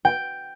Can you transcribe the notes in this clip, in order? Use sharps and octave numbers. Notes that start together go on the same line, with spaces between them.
G5